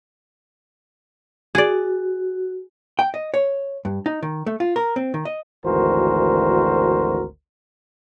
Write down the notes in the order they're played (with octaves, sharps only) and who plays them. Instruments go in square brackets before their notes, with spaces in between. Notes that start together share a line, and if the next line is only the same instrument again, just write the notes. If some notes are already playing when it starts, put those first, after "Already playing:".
[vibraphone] F#4 [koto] G#4 D5
[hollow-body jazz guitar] G5
D#5
C#5
G2
D#4
D#3
A3
F4
A#4
C4
D#3
D#5
[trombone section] G#1 D2 E3 F#4 A#4 C5